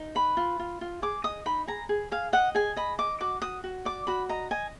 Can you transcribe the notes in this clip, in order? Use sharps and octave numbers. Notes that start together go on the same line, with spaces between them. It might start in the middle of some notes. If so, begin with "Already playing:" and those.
Already playing: D#4
B4 B5
F4
F4
F4
G#4 D6
D#5 D#6
D#4 B5
G#4 A#5
G#4
G#4 F5
D#5 F#5
G#4 G#5
D#5 B5
D#5 D6
F#4 D6
F#4 D#6
F#4
D5 D6
F#4 B5
D#5 A#5
D#5 G#5